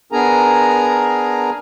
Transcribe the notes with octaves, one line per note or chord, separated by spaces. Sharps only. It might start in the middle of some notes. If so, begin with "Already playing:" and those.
B3 D4 G#4 A#4 G#5 A#5